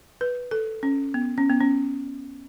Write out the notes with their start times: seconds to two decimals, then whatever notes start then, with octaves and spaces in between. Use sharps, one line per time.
0.21 B4
0.51 A4
0.83 C#4
1.14 B3
1.38 C#4
1.50 B3
1.61 C#4